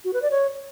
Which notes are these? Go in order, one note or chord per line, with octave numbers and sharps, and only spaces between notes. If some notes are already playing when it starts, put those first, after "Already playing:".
F#4
B4
D5
C#5